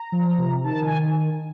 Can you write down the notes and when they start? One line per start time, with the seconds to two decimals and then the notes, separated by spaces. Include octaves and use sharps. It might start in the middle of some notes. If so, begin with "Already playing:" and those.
Already playing: A#5
0.12 F3
0.38 C3
0.64 D#3 A5
0.82 G#5